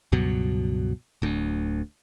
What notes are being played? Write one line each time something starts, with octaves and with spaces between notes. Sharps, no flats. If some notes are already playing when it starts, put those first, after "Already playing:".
C#2 G2 B2 F#3
D1 D2